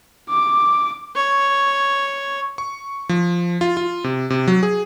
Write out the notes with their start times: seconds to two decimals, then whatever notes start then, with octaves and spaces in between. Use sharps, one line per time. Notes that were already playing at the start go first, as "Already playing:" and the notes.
0.29 D6
1.15 C#5
2.58 C#6
3.09 F3
3.61 F4
3.77 F4
4.04 C3
4.30 C3
4.48 F#3
4.63 G#4